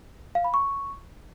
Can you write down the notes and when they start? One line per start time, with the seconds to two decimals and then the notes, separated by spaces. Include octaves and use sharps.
0.35 F5
0.44 B5
0.54 C#6